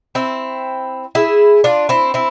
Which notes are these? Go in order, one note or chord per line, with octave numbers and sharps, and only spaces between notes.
C4 E4
E4 G#4
D4 F4
C4 E4
C4 E4